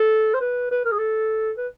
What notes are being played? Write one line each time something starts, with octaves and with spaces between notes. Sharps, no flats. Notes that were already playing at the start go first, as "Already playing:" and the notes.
Already playing: A4
C5
B4
B4
A#4
G#4
A4
B4